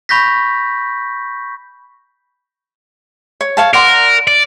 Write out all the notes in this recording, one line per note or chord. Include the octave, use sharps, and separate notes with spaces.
B5 C#6 G6 A#6 B6
C#5
C#5 F5 A5
A#4 D5 F#5 C6
D5